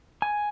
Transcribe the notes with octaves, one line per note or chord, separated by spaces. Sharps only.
G#5